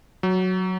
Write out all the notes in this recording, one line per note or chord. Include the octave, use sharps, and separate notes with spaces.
F#3